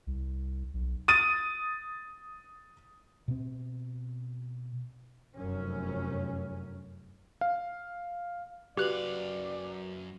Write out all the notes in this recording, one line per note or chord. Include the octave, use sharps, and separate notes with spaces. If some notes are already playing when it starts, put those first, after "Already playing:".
C2
B1
D#6 A6 D#7
B2 C4
F1 F#2 C#4
F5
F#2 F#4 G4 B4 D5 F5 F#6 F#7